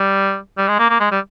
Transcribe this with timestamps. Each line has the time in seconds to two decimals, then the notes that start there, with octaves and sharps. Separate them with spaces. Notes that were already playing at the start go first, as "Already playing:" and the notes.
Already playing: G3
0.58 G3
0.68 G#3
0.79 A#3
0.90 A#3
1.00 G#3
1.11 G3